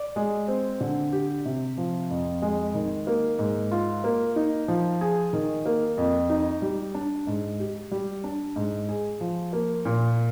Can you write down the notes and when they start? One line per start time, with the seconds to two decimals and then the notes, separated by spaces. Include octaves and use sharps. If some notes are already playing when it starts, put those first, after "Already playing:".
Already playing: D5
0.16 G#3
0.48 C4
0.81 D3
1.12 G4
1.46 C3
1.78 F3
2.10 F2
2.42 G#3
2.74 D#3
3.07 A#3
3.39 G#2
3.71 F4
4.04 A#3
4.36 D#4
4.68 F3
5.01 G#4
5.33 D#3
5.66 A#3
5.98 F2
6.30 D#4
6.62 G3
6.94 D4
7.27 G#2
7.59 G4
7.91 G3
8.24 D4
8.56 G#2
8.89 G#4
9.21 F3
9.53 A#3
9.85 A#2